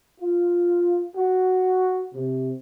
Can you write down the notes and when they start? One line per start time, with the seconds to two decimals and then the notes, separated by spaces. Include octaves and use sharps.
0.20 F4
1.16 F#4
2.14 C3